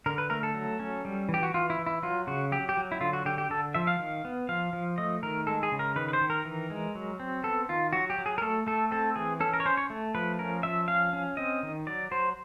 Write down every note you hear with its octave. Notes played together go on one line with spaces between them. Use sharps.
D3 A#4
B4
A3 A#4
A4
F#3
C#4
G3
E3
G4
F#4
E3 F4
E4
E3
E4
F#3 F4
C#3 F#4
F#3 G4
G4
F#3
E4
D3 F4
F#4
D3 G4
G4
D3 A4
F3 E5
F5
D#3
B3
F3 F5
F3
A3 D#5
D#3 A#4
G#3 A4
G#4
C#3
A#4
D#3 B4
B4
C5
D#3
A#4
E3
G#3
F#3
C4
B3 A4
D#3 F4
F#3 F#4
G4
F#3
G#4
A#4
A3 A4
A3 A4
C4 A4
E3 G#4
C#4 A4
A#4
C#5
C#4 C5
C#5
A3
F3 B4
C#4 A#4
F3 E5
C#4 F5
C#4
C4 D#5
D#3
F#3 D5
F#3 C5